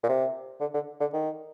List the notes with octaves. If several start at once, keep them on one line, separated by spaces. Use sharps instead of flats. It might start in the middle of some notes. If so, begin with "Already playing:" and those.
A#2
C3
D3
D3
D3
D#3